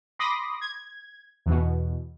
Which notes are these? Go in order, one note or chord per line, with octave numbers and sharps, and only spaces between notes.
B5 C6 D6 D#6 A#6
G#6
E2 B2